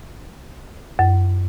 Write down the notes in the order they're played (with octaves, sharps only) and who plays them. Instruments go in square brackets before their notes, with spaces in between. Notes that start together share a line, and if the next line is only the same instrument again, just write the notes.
[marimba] F#2